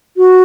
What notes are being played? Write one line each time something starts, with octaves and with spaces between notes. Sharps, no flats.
F#4